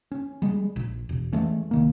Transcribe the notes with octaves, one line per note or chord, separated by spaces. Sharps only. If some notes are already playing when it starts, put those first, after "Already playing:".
C#4
G3 G#3
A#1
E1
E3 G#3 A3 C#4
C2 D#3 A#3